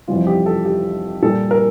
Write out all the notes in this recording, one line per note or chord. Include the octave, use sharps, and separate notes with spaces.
F2 C3 E3 G3 F4
G4
A4
G4
A#2 G3 A4
A#4